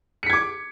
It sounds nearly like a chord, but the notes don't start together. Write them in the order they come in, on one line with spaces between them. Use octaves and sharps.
C#7 B6 G#6 D6